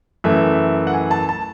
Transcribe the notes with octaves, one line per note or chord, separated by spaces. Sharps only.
F#2 E3 A3 E5
F#5
G#5
A5
A5